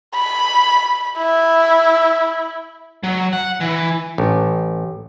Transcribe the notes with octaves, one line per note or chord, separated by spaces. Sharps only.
B5
E4
F#3
F#5
E3
A1